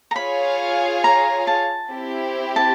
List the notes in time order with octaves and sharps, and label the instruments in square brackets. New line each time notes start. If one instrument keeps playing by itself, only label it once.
[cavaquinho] A#5
[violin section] F4 G#4 C#5 F5 [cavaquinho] B5
[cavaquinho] A#5
A5
[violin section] C4 E4 G4
[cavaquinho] A5